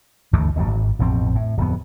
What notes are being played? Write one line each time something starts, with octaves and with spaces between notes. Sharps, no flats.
G1 D2 E3 A3
F#1 D#2 G#2 F#3
G#1
A1 F2 B2 C4
A2
D1 F2 B3